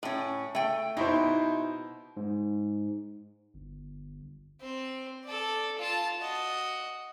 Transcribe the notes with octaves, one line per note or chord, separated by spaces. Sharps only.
A2 C#4
A3 G5
B2 D#4 E4 C5
G#2
G1
C4 C5
A4 D5
F4 A5
F#4 D#5